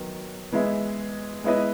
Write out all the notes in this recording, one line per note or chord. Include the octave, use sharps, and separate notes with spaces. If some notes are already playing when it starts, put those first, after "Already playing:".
Already playing: D#3 F#3 B3
E3 G#3 B3 E4
G#3 B3 E4 B4 D#5